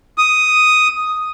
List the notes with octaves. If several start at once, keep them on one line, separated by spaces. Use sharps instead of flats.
D#6